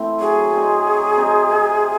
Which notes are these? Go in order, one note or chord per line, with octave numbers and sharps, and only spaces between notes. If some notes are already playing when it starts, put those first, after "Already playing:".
Already playing: E3 A3 C4 E4
F#3 G#4
C4 D#4
F#3
C4 D#4
C3